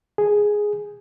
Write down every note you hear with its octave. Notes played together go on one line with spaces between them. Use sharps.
G#4